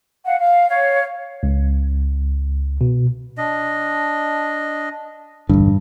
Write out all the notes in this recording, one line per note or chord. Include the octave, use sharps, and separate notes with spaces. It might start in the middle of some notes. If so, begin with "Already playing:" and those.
F5 F#5
F5
C#5 F5
C#2
B2
D4 D#5
E1 A1 G2 D3